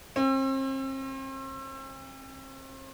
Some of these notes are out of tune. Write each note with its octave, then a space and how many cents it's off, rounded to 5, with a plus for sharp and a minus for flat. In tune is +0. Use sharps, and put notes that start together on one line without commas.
C4 +40